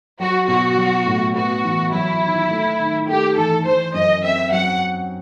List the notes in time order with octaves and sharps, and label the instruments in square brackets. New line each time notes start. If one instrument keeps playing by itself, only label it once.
[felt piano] F#3 [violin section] F#4
[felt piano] B2 [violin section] F#4
[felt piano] F#3
A2
[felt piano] B3 [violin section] F#4
[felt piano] E3
[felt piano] F#3 [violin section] E4
[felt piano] D#3
A3
D#3
[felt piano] A3 [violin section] G4
[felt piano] E3 [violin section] A4
[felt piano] E3 [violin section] C5
[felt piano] F#2 [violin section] D#5
[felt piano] C4 [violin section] E5
[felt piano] F#3 [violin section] F#5